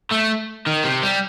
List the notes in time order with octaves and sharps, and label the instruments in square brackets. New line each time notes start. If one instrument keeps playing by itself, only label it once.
[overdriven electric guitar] A3
D#3
C3
G3